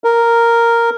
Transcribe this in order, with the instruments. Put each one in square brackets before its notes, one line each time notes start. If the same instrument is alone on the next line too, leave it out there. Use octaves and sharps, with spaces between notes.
[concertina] A#4